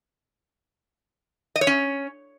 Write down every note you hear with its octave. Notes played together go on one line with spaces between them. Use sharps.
D#5
C#5
C#4